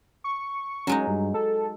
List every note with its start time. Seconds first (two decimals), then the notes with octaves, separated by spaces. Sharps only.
0.24 C#6
0.87 F#3 G#3 C#4 D#4
1.07 G2
1.34 A4